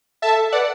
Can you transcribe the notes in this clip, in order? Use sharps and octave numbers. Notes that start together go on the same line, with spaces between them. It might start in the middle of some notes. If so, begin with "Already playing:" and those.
A4 E5 A5
B4 D5 F#5